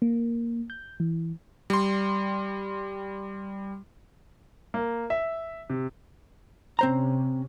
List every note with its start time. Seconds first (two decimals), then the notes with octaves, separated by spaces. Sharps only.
0.02 A#3
0.70 G6
1.00 E3
1.70 G3 C6
4.74 A#3
5.10 E5
5.70 C3
6.79 C3 C4 C#4 C5 A#5